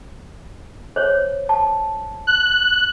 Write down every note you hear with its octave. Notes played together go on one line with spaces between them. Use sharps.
C5 C#5
A5
F#6